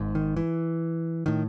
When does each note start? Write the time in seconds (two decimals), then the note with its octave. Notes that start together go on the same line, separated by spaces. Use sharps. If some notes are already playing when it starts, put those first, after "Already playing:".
Already playing: G#1 G#2
0.15 D#3
0.37 E3
1.26 A2 D#3